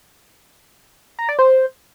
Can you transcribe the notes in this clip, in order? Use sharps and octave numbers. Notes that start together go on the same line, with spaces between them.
A#5
D5
C5